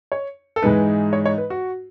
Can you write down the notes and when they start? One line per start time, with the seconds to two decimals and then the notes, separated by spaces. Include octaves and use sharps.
0.12 C#5
0.56 A4
0.62 G#2 E3 G#3 D#4 B4
1.13 C#5
1.26 C#5
1.38 B4
1.50 F#4